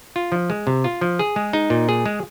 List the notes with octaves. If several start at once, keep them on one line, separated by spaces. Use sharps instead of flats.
F4
F3
G#3
C3
F4
F3
G#4
G#3
D#4
A#2
G#4
G#3